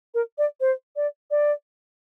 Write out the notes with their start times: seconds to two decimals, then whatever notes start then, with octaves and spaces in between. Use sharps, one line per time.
0.15 A#4
0.38 D5
0.61 C5
0.96 D5
1.31 D5